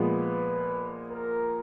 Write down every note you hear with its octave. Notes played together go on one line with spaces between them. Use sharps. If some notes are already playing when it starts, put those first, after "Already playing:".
Already playing: A#2 F3 G#3 B3 B4
A#4